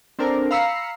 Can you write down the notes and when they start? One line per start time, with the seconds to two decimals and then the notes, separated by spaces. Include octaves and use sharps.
0.19 C4 D4 A4 A#4 C5
0.51 F5 A#5 B5 E6 C7 C#7